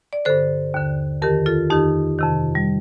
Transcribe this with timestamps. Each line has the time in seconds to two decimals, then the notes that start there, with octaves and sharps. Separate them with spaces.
0.13 D5
0.25 G2 D3 A4 C5
0.74 D#2 D3
1.22 F2 D#3 G4 A#4
1.46 F4 A4
1.70 F2 D#3 D#4 G4
2.18 F2 C3 D#3
2.55 G3